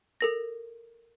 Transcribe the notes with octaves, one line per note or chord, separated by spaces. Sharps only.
A4 A#4 A#6